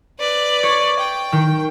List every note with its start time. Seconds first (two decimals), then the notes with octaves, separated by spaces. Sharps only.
0.20 B4 D5
0.63 C#5
1.00 G5
1.32 D#3